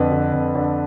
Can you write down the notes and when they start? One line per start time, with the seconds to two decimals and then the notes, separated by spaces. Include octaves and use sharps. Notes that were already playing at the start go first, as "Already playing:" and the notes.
Already playing: F2 D3 B4
0.11 D3
0.33 F2
0.55 D3